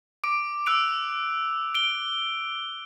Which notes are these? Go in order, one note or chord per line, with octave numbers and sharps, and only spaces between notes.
D6 D7
D6 E6 F#6 D7 F7
D7 G7